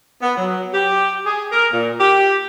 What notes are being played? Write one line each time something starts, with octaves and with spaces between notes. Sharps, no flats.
B3
F#3
G4
G#4
A#4
A#2
G4